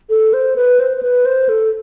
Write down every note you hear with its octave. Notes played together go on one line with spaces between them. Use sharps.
A4
C5
B4
C5
C5
B4
C5
A4